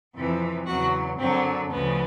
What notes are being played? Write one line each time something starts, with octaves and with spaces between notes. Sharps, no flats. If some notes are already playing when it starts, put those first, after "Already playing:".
F2 C3 E3
E2 C#3 F#3 F#4
F#2 D3 F#3 C4
D2 C#3 F3 B3